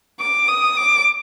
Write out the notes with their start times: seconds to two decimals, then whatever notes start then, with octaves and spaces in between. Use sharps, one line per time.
0.20 D6
0.48 D#6
0.76 D6